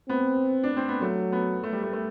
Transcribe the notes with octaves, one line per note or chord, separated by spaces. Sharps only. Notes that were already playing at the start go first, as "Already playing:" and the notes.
B3 C4
D4
C4
B3
F#3 A3
B3
A3
G3
A3
A3